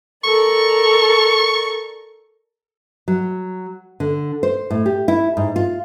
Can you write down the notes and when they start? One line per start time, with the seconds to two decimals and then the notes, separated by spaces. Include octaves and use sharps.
0.24 A4 A#4 D5 C#6
3.08 F#3
4.00 D3
4.43 C5
4.70 A2
4.86 G4
5.08 E4
5.37 G#2
5.56 F4